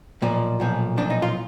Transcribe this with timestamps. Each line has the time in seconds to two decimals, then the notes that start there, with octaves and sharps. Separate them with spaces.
0.22 B1 A#2 F3
0.60 B1 A#2 F3
0.97 B1 A#2 F3 D4
1.10 D#4
1.22 F4